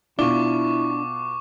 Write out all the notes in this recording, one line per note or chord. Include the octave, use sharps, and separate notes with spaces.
B2 D4 E4 F4 C#6 D6 G7